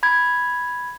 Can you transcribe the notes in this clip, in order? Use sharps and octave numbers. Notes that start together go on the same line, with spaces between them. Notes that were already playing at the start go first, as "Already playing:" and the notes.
B5 G#6